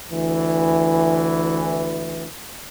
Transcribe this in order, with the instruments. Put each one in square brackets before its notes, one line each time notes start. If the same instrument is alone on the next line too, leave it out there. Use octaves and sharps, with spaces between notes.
[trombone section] D2 E3